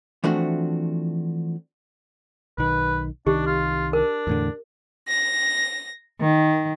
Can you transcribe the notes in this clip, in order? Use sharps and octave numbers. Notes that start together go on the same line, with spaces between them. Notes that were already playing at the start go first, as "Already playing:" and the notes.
E3 F3 A3 C4 D4 F#4
B1 D#3 B4
C2 D#3 D4 G4
F4
D4 A#4
E2 A2 D3
A#6
D#3